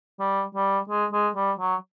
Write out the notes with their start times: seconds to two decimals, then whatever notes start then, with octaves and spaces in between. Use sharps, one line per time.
0.20 G3
0.55 G3
0.90 G#3
1.13 G#3
1.36 G3
1.59 F#3